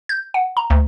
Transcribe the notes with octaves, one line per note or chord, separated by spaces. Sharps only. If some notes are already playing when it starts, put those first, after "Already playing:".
G6
F#5
A#5
D2